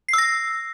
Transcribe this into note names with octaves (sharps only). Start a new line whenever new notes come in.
E6 A#6 C7